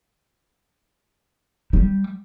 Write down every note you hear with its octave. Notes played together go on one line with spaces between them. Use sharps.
G3